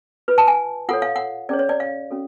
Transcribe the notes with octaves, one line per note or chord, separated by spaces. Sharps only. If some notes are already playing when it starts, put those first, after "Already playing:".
F4 B4
A5
G#5
F4 A4 C#5 F#5
F5
F#5
C#4 G#4 C#5 D5
C#5
D5
F5
C#4 F#4 A4